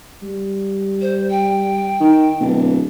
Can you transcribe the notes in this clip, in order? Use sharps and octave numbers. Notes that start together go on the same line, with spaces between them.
G3
C5
G5
D#3
D1 B2